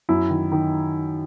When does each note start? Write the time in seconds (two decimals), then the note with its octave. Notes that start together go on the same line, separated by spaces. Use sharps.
0.09 F#2 E4
0.30 D#3
0.52 D#3